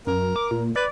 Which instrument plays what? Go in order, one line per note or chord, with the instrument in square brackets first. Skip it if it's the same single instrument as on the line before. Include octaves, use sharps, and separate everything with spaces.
[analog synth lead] F#2 [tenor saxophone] A#4
[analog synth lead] D6
A#2
[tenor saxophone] B4 [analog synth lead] D5